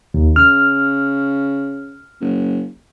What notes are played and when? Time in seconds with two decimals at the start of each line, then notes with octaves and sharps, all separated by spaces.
0.14 D#2
0.36 C#3 F6
2.21 F#1